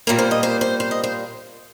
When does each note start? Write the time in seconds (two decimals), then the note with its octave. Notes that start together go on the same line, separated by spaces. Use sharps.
0.07 A#2 G3 A#3 A#4
0.19 C5
0.31 D#5
0.43 C5
0.61 C5
0.80 C5
0.91 D#5
1.04 C5